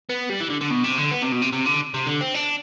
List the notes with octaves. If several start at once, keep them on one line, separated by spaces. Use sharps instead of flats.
B3
G3
E3
D3
D3
B2
C3
D3
B3
C3
B2
C3
C3
D3
C3
D3
C4
D4